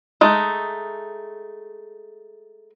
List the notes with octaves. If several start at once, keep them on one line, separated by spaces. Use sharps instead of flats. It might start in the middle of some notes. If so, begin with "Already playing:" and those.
G#3 A3 D#4